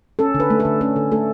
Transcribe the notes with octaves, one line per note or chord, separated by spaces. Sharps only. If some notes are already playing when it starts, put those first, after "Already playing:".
C#4 A4
D3
B4
A3
A4
D3
C#4 A4
D3
A3 A4